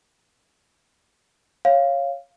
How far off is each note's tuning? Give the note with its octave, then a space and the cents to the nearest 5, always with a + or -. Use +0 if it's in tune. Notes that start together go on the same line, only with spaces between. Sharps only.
C#5 -10 F5 -5